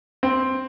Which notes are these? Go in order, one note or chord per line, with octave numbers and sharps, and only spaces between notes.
C4